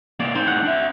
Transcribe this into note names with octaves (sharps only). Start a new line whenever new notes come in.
C3 A#3 D5
A2 C4 D#4
F#5
D4 E5